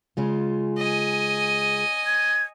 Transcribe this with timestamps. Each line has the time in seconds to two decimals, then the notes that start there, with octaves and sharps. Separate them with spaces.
0.17 C#3 G#3 F4
0.77 D#5 G#5
2.06 G#6